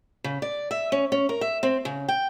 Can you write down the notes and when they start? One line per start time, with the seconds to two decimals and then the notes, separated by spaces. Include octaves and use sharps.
0.24 C#3
0.42 D5
0.71 E5
0.92 C#4
1.12 C#4
1.29 A#4
1.41 E5
1.63 C4
1.85 C#3
2.08 G5